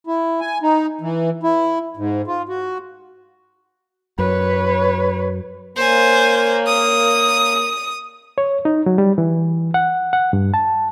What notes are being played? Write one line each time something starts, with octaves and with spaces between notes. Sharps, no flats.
E4
G#5
D#4
E3
E4
G#2
F4
F#4
F#2 B4 C#5
A#3 C5 C#5 G#5
D#6
C#5
D#4
F#3
G3
E3
F#5
F#5
G2
A5